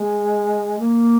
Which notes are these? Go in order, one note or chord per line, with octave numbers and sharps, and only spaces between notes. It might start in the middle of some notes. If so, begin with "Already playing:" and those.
Already playing: G#3
A#3